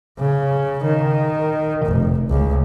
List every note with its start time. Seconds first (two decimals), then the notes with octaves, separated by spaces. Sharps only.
0.19 C#3
0.84 D#3
1.85 F1
2.30 C#2